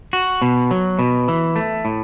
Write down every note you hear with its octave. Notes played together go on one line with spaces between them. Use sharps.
F#4
B2
F#3
B2
E3
A3
A2